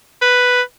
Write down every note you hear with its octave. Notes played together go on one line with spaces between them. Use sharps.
B4